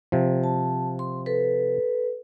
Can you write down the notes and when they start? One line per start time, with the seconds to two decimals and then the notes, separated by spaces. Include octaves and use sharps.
0.12 C3 F3
0.44 A5
0.99 C6
1.26 A4 B4